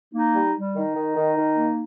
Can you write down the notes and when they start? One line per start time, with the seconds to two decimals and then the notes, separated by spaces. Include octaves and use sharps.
0.13 A#3 D#4
0.34 G3
0.55 G3
0.74 D#3 D#4
0.95 D#3
1.16 D#3
1.36 D#3
1.55 A#3